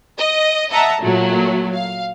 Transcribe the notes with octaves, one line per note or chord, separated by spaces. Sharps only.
D#5
D#5 E5 F#5 A5 A#5
A#2 F#3 A3
F5